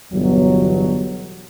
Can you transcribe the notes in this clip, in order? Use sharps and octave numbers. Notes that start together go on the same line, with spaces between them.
G1 E2 B2 F#3